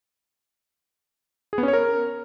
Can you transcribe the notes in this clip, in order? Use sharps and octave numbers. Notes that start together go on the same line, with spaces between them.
G#4
B3
C#4
C#5
A#4